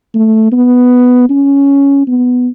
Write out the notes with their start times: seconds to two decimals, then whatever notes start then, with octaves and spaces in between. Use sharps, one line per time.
0.14 A3
0.52 B3
1.30 C#4
2.07 B3